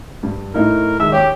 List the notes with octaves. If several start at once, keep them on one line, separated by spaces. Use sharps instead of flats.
G2
A2 D#4 E4 A#4
D#3 G#3 E5 E6
G4 C#5 D6